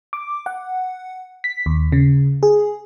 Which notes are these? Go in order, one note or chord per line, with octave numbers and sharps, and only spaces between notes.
D6
F#5
B6
D#2
C#3
G#4